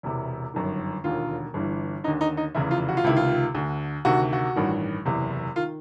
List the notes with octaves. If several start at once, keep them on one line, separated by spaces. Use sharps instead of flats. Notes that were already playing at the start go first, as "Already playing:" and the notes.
E1 E2 C3 E3
G1 F#2 D#3
E1 D#2 D3 F4
G1 G2 E3
D#2 D3 D#4
D#4
D#4
F1 E2 C#3 E3 E4
F4
F#4
F4
C#2 C3 D#3 E4
F4
D2 D3
D2 C3 D#3 F#4
F#4
A1 G2 D#3
F#1 E2 C3
D#3 F4